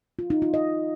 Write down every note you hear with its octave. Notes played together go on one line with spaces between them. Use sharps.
F4
D#4
F4
D#5